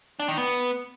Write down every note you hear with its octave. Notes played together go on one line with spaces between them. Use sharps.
D4
D#3
B3